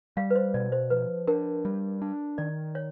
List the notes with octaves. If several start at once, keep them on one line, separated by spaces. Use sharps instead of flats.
G3 F5
B4
C5
B2 D5
C5
F3 B4
D4 A#4
G3
D4
D#3 D5
C#5